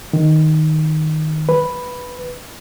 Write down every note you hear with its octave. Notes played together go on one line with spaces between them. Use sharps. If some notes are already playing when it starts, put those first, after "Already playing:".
D#3
B4